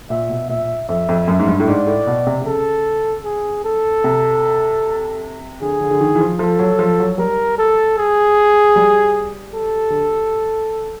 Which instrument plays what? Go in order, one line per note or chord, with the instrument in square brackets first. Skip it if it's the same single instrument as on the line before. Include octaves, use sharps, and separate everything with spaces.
[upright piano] A#2 [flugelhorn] E5
[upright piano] B2
[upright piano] A#2 [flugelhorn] E5
[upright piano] F2 [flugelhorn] E5
[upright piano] F2
F#2
G#2
G2
A2
[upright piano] G#2 [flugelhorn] D5
[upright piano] A2
B2
C3
C3
[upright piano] C#3 [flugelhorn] A4
[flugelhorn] G#4
A4
[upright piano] C3
[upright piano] D3 [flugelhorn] G#4
[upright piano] D3
D3
D#3
E3
F3
[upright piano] F3 [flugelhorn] A4
[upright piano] F#3
F3
F#3
[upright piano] G3 [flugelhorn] A#4
[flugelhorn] A4
G#4
[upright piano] G3
[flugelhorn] A4
[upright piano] D3